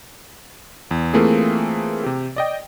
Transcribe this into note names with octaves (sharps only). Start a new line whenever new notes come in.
E2
E3 A3 A#3 C4 F4 G#4
C3 G4
D5 D#5 G5